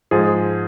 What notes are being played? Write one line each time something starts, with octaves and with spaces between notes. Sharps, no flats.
G#2 F3 G#4